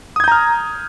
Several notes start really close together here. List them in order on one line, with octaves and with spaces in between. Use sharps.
D#6 G#6 G6 A#5 F6